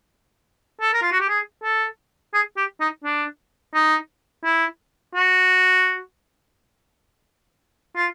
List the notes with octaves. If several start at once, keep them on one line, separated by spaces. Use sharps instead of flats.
A4
A#4
F4
F#4
G4
G#4
A4
G#4
G4
D#4
D4
D#4
E4
F#4
F4